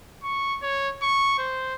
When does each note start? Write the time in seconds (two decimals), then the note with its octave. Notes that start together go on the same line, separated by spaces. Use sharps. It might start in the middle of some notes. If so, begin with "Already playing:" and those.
0.23 C#6
0.62 C#5
1.02 C#6
1.38 C5